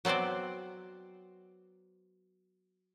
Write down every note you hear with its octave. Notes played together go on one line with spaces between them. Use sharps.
F#3 B3 C4 C5 D5